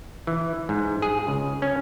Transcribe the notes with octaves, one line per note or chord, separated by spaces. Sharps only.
E3
G#2
G#4
C#2
C#4